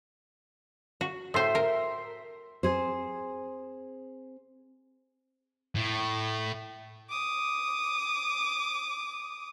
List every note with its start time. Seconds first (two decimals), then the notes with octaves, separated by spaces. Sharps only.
1.01 F#4
1.34 A2 C5 E5 C6
1.55 A#4
2.63 C4 G#4 C5
5.75 A2
7.09 D6 D#6